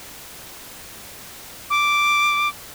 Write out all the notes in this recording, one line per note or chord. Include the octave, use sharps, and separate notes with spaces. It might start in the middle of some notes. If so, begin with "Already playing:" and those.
D6